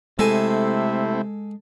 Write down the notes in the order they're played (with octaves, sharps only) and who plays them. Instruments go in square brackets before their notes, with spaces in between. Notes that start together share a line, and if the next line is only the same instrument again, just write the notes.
[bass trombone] C3 [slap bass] G#3 [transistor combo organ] A3 C4 E4 [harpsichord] A4 G#5